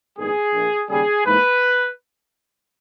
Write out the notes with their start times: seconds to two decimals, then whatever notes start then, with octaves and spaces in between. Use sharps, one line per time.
0.17 A#1 G#2 D#3 G3 B3 G#4
0.53 A#1 A#2 A#3
0.89 D#2 C#3 G3 C#4 G#4
1.25 G#2 E3 A#3 B4